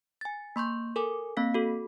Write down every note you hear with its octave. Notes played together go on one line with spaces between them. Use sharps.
G#5 A6
A#3 C6 C#6 G6
A4 A#4 G#5 D6
A#3 C4 F5 B6
F#4 A4